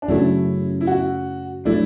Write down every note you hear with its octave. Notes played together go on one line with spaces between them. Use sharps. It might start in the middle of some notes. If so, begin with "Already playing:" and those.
D4
F#2 C#3 F#3 A3 E4
E4
F#4
F#3 A3 D4 E4